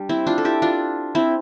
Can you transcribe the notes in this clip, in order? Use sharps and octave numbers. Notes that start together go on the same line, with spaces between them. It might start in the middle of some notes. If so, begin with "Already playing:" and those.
Already playing: G3 D4
C4 E4
D4 F4
A4
E4 G4
D4 F4
C4 E4